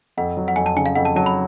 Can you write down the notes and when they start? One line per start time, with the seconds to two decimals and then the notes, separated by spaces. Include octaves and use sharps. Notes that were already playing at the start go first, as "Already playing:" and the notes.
0.17 F2 F#5
0.37 F#3
0.48 F#5
0.56 F2 G#5
0.66 A5
0.76 C#3 G#5
0.86 F5
0.95 F2 F#5
1.05 A5
1.16 F#3 A5
1.26 B5